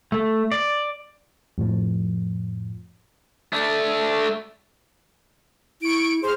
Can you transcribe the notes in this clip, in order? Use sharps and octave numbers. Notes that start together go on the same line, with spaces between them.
A3
D5
F2 A2 F3
A3 D4
E4 C#6 D7
G#4 C5 F6